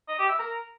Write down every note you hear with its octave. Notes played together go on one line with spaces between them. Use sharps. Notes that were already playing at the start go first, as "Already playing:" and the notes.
D#5
G4
E5
A#4